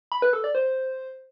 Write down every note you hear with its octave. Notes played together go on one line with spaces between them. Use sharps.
B5
B4
A4
D5
C5